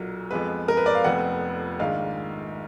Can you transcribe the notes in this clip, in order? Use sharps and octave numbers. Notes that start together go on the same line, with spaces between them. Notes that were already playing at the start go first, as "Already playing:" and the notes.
Already playing: B1 A#2 F#3 A#3
F2 F3 G#3 B3 B4
A#4
B4
D5
F5
F1 F2 F3 B3 F#5
A#1 G#2 D#3 F5